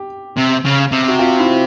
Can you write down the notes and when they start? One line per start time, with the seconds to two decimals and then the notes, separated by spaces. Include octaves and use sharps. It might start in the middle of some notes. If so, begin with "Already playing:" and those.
Already playing: G4
0.37 C3
0.65 C#3
0.92 C3
1.08 F#4
1.19 F4
1.39 E4